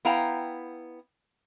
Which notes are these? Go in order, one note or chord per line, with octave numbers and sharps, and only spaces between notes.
B3 E4 F5 G5 A#5